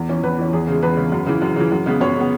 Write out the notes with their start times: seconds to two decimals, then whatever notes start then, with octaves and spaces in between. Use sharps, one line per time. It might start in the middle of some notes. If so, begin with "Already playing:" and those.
Already playing: E2
0.09 E3 C#4
0.23 E2 B4
0.38 E3 C#4
0.53 E2 G#4
0.67 C#3 G#3
0.82 E2 B4
0.97 C#3 G#3
1.12 F#2
1.26 C#3 E3
1.42 F#2
1.56 C#3 E3
1.72 F#2
1.86 C#3 G#3 B3
2.01 F#2 C#5
2.16 C#3 G#3 B3